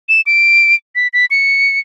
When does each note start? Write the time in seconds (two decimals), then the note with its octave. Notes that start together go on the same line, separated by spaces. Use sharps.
0.09 E7
0.26 D7
0.95 B6
1.13 B6
1.31 C#7